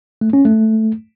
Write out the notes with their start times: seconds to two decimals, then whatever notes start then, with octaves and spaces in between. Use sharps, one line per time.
0.21 A3
0.33 C#4
0.45 A3